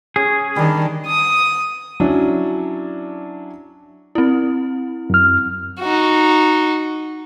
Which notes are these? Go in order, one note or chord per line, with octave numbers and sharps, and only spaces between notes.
C#4 G#4
D#3 G3 D4
D#6
F#3 C#4 D4 E4
C4 E4
F#2 F6
D#4 F#4